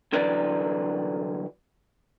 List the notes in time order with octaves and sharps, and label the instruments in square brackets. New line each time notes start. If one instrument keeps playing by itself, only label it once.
[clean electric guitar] C2 D3 E3 F#3 B4 D5